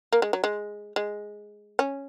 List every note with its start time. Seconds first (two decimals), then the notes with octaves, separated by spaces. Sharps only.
0.13 A#3
0.22 G#3
0.33 F#3
0.44 G#3
0.96 G#3
1.79 C#4